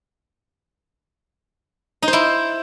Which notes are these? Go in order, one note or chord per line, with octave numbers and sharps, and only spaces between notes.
D#4
C5
E4